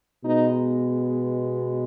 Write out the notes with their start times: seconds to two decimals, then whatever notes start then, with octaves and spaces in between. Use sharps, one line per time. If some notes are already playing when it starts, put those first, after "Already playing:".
0.24 B2 G#3 B3 D#4